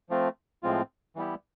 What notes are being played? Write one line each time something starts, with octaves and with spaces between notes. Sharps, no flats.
F3 A3 C4 F4
A2 F3 G#3 C4 F4
E3 G3 B3 E4 G4